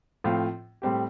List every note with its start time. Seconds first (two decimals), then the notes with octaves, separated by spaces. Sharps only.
0.24 A2 F3 C4 F4
0.82 A2 G3 C4 G4